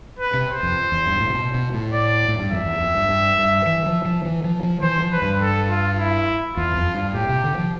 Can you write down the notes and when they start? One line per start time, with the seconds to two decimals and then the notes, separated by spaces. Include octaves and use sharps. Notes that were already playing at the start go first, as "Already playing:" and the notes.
0.19 B4
0.34 C3
0.48 C5
0.63 F2
0.92 E2
1.06 G2
1.20 A2
1.29 C3
1.34 B2
1.54 B2
1.74 A2
1.93 D5
2.28 A2
2.39 G2
2.50 F2 E5
2.65 E2
2.80 F2
2.95 G2
3.09 G2
3.38 G2
3.66 E3
3.86 F3
4.05 F3
4.25 E3
4.44 F3
4.63 F3
4.82 E3 C5
5.02 F3
5.12 B4
5.22 G2
5.41 A4
5.70 F4
5.99 E4
6.56 E2 F4
6.76 F2
6.95 G2
7.14 A2 G4
7.29 C3
7.44 D3
7.58 F3